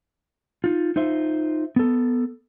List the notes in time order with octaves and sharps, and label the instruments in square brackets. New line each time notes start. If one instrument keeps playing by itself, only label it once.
[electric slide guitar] D#4 F4
D#4 F4 C5 E5
B3 A4